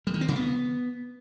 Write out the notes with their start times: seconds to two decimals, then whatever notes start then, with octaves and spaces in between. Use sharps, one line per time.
0.07 G3
0.14 D#3
0.21 C4
0.28 C#3
0.35 B3